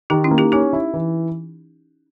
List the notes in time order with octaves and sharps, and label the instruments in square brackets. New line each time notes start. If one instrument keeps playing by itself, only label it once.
[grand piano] D#3 [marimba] D#4 G4
[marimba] C#4 E4
[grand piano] A#3
[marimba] D#4 G4
[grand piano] C#4 [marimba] D#4 G4
[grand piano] E4
E3